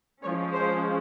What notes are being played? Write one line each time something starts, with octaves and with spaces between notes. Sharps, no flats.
F3 G#3 C#4 C#5
C5